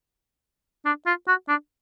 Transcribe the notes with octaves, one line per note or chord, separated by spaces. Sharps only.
D4
F4
F#4
D4